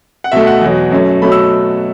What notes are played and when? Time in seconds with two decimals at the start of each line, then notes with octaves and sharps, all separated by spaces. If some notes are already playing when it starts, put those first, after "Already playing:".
0.24 F#5
0.32 B2 A3 E5
0.47 F#5
0.62 E2 B2 F#3
0.92 F#2 F#3 A3
1.22 B2 F#3 A3 B5
1.32 E6